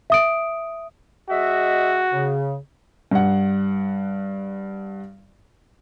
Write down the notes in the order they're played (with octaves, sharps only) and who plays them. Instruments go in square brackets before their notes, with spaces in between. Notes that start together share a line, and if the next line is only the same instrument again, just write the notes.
[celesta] E5 D#6 D7
[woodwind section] G#3 D#5 E5 [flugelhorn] F#4
[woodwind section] C#3
[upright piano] G2 F#5